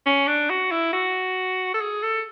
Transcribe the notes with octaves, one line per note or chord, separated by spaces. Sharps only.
C#4
D4
F#4
E4
F#4
A4
G#4
A4